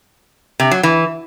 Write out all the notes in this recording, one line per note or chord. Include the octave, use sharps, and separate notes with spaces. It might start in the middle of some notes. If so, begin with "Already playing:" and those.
C3
F#3
E3